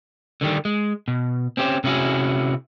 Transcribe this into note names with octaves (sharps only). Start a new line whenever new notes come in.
D3 D#3 G3
G#3
B2
C4 C#4 G4 B4 C5
C3 C#4 D4 E4 F#4 G#4